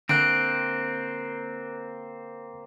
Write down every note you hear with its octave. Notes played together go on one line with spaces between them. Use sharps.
D3 A#3 C4 F#6 D7